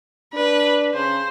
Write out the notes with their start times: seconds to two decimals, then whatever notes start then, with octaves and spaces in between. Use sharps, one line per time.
0.34 D4 B4
0.94 C#3 C5